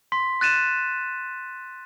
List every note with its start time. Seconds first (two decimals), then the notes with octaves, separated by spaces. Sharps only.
0.12 C6 B6
0.41 F#6 A6 D#7 E7